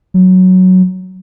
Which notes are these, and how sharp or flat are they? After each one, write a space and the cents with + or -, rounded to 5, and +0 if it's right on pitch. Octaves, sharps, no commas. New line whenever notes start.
F#3 +0